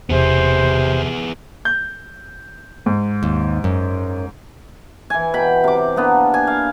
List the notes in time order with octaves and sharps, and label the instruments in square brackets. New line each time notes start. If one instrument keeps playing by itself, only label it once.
[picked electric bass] E1 [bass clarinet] C3 [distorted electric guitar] B3 G#4 [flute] C5
[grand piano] G6
G#2
[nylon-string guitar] D#2
F#2
[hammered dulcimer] E3 G#5
B2 G5 B5
C3 D6
A#3 B3 D4
G#5
F5